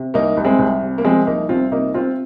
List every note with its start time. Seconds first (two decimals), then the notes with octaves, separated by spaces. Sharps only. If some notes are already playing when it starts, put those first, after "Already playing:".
Already playing: C3
0.14 C2 A#3 D#4
0.37 C2
0.45 G#3 C4
0.59 C2
0.82 C3
0.98 A#3
1.05 F3 G#3 C4
1.27 C2 A#3 D#4
1.49 C2 C4 F4
1.72 C3 A#3 D#4
1.94 C3 C4 F4